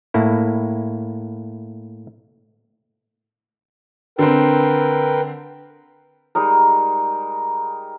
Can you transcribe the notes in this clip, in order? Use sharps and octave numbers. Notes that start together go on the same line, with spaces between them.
A2 A#3 E4
D3 C4 A#4 B4 G5
G3 G#3 D#4 A#4